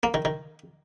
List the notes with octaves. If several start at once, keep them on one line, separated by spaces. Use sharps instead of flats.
A#3
D#3
D#3